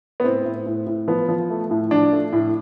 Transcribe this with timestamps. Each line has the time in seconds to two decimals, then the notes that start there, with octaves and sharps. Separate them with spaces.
0.20 B3
0.24 A2 C4
0.45 A2
0.66 A2
0.86 A2
1.08 F3 B3
1.29 F3
1.50 A3
1.71 A2
1.91 F3 D4
2.12 A3
2.33 A2